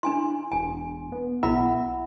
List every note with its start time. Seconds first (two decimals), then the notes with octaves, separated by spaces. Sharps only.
0.03 D4 E4 G#5 C6
0.52 E1 G#5
1.12 B3
1.43 B1 E4 E5 F#5 B5